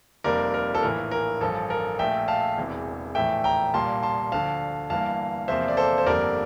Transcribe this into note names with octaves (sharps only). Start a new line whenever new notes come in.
F1 F2 C3 G3 A#3 A#4 D5
A#4
A4
A#1 A2 E3 A#3 A#4
A#4
A1 G2 F3 A4
A#4
A#1 A#2 A3 E5 G5
F5 A5
E1 E2 C3 E3
A#1 A2 E3 A3 E5 G5
G5 A#5
C2 A#2 G3 A#3 A5 C6
A5 C6
D2 D3 F3 F5 A5
G1 G2 E3 A#3 F5 A5
E2 C3 F3 A#3 C5 E5
D5
A4 C5
C5
G1 F2 D3 G3 A#3 A#4 D5